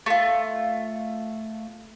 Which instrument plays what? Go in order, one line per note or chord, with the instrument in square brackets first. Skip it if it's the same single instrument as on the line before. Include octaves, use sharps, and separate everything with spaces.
[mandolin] A3 F4